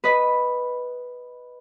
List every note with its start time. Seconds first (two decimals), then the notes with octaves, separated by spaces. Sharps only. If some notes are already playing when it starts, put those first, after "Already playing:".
0.04 B4 D#5 B5